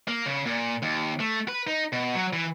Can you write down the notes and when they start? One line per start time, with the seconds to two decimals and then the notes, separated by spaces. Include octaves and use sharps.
0.08 A#3
0.26 C#3
0.46 A#2
0.82 D#2
1.20 A3
1.48 B4
1.67 D#4
1.92 B2
2.15 F#3
2.33 E3